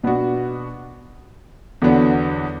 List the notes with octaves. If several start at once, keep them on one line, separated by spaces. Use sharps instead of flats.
B2 B3 D4 F#4
E2 D3 F#3 B3 D4